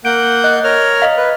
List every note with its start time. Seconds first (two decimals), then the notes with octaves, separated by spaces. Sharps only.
0.05 A#3 F#5 G6 D7
0.44 D#5 F#6
0.64 A#4 C#5 F6
1.02 D#5 F5
1.17 B4